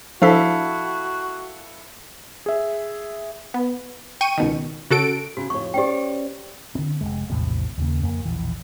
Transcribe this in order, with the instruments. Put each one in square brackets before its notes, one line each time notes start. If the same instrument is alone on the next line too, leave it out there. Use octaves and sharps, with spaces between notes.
[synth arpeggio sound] F3 D4 B6 [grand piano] E4 A4 F5 [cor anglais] F#4
[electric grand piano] G#4 E5
[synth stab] B3
G5 C#6 D#7
C#2 B2 D#3
C#3 F#4 A4 D7
[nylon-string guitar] C#3 [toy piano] F#4
[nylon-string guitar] F2 A2 C#5 [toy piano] C#6
[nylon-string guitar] C#4 C5 D5 [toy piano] G4 G5
[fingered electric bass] D3 C4
F1 C#2 G#3
A#1 E2 A2 C3
D#2 C#3 A#3
F2 A#3
E1 A#1 E3